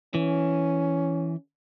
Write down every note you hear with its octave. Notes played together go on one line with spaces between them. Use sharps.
E3 C#4